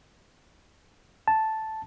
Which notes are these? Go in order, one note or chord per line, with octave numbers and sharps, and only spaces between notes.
A5